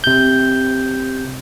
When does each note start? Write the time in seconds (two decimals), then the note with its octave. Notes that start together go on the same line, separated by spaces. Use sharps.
0.04 C3 G6